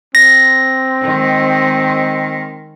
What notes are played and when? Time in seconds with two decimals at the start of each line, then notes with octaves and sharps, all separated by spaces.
0.15 C4 A#6
1.02 D#3 G#3